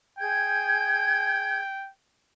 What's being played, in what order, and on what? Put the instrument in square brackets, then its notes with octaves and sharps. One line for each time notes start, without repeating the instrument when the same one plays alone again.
[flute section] G#4 G6 G#6 [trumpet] G5